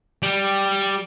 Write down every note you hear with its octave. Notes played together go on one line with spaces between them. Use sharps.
G3